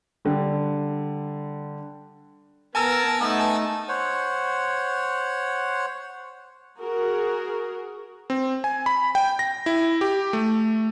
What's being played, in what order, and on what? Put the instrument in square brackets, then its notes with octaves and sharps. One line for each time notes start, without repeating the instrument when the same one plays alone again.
[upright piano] D3 G3
[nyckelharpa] B3 [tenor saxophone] A#4 [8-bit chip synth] G#5 A5 E6
[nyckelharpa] A3 D#4 [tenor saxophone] B3
[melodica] C5 C#5 F#5
[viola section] F#4 G#4 A#4
[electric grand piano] C4
G#5
B5
G5
A#6
E4
G4
A3